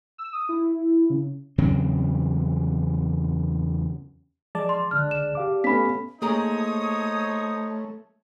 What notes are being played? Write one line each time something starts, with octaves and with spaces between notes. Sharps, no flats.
E6
D#6
E4
C#3
E2 C#3 F#3 C4
F3 G#3 D5 A5
C6
C2 D3 F6 F#6
E7
G4 F5 D6
A3 B3 C#4 B5 B6
A3 A#3 D#4 G#4 C5 C#5 A#5 D#6